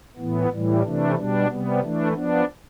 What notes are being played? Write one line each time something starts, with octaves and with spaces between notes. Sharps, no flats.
A2 E3 B3
A2 E3 G3
C3 E3 A3 D4
B2 G3 D4
C3 G3 B3
E3 A3 D4
F3 B3 D4